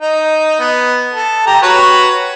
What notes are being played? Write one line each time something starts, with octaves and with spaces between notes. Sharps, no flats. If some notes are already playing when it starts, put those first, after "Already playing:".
D#4
B3
A4
G4 A#5
F#4 B4 C#5